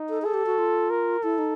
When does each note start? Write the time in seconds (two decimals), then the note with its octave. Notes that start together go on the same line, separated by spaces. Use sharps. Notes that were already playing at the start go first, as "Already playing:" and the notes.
Already playing: D#4
0.09 A4
0.22 G#4 A4
0.34 G4
0.46 F#4
0.58 F4
0.90 A#4
1.23 E4 A4
1.38 D#4